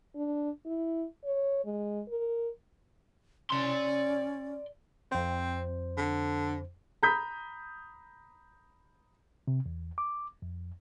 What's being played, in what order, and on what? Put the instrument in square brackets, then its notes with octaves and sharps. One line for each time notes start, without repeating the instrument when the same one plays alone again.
[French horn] D4
E4
C#5
G#3
A#4
[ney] C#4 [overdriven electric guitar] D5 C6
[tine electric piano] F2 C5 [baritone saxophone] C4
[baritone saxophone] D3
[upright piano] A#5 B5 D#6 G6 B6
[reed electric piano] C3
E2
D6
F2